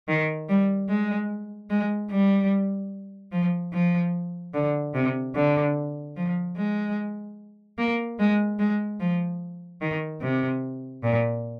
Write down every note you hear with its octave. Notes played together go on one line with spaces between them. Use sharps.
D#3
G3
G#3
G#3
G3
F3
F3
D3
C3
D3
F3
G#3
A#3
G#3
G#3
F3
D#3
C3
A#2